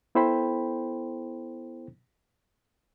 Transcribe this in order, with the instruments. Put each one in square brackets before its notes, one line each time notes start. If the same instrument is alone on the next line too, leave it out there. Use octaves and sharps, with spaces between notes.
[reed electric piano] B3 E4 A4 C5 G5 B5